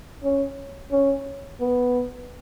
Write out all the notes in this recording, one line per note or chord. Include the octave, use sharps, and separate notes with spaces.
C#4
C#4
B3